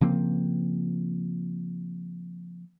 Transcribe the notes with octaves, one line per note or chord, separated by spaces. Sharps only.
C#3 F3 A#3 C4